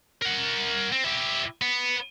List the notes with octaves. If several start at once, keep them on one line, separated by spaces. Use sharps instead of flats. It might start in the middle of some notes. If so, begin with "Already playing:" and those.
A#4 F#5
C4
E4 G4
B3